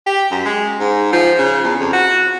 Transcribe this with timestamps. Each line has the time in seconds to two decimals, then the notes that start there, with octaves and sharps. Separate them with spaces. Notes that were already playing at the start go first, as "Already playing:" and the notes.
0.06 G4
0.31 F#2
0.45 G#3
0.80 G#2
1.12 F3
1.39 C#3
1.64 E2
1.80 F2
1.93 F#4